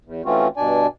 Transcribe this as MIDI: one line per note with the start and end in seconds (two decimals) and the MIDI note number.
0.05 0.22 40
0.25 0.47 52
0.25 0.47 57
0.25 0.47 60
0.25 0.47 61
0.25 0.47 65
0.25 0.47 66
0.57 0.87 43
0.57 0.87 47
0.57 0.87 62
0.57 0.87 74
0.57 0.87 80